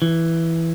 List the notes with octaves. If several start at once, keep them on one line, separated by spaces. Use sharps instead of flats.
E3